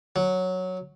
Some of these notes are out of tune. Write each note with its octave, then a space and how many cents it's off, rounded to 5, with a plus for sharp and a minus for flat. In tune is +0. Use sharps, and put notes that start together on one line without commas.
F#3 -5